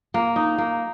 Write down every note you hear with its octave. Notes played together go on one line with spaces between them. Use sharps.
A#3
D#4
A#3